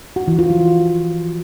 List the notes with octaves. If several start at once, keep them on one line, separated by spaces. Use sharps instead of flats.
F#4
E3
F4
F3